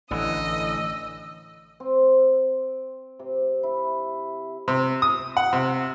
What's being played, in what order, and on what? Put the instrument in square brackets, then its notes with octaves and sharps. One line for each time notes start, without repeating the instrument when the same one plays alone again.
[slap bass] A1 [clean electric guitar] D3 E3 [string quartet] D#5 [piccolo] E6
[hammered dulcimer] C4
C3
E4
[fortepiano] C3
D#6
F#5
C3